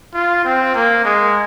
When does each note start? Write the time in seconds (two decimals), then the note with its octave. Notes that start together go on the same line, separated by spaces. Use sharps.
0.14 F4
0.45 C4
0.74 A#3
1.05 G#3